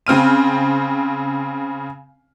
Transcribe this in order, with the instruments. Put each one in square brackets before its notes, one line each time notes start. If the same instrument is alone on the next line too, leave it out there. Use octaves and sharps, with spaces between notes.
[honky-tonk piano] C#3 C4 F6 D#7